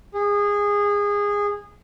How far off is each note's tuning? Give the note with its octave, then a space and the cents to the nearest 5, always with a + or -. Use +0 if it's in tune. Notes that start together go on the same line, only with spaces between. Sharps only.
G#4 -20